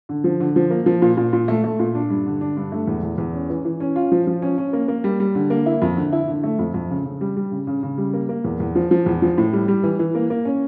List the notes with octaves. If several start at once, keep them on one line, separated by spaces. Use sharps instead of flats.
D3
F3
D3
F3
A#3
F3
A#2
A#2
A#2
A3
A3
A#2
D4
G2
D3
D4
G2
A3
E2
E2
E2
C#4
E3
E3
C#4
F4
F3
F3
C#4
C#4
A#3
A#3
G3
G3
D3
A#3
E4
F2
D3
E4
D3
A3
F2
F2
C#3
C#3
G3
G3
C#3
C#3
C#3
G3
A#3
A#3
E2
E2
F3
F3
E2
F3
A2
G3
G3
E3
E3
A#3
A#3
C#4